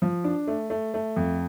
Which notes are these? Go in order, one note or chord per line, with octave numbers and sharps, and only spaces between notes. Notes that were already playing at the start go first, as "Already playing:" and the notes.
F3
D4
A3
A3
A3
F2